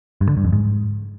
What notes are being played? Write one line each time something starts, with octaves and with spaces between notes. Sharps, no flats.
G2
D3
G2
F2
G#2